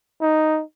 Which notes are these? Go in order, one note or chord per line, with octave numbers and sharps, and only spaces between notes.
D#4